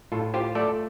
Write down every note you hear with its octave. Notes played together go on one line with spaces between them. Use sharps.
A2 F4 A4
F4 G4 C5
A3 A4 D5